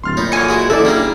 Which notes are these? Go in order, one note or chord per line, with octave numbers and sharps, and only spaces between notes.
D1 C6 F6 A6
A#2 D#4 C#5 B5 G6
D3 E3 F#3 G#5 C#7
G#3 E4 F#4
F#1 E3 F#3 D#4 E4 A4 D5
G3 A#3 D4 E4 G#4 A#5